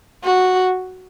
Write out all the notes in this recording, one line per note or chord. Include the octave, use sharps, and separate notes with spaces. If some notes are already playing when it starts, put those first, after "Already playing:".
F#4